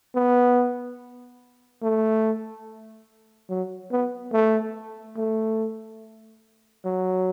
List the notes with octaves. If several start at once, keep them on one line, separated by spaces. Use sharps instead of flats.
B3
A3
F#3
B3
A3
A3
F#3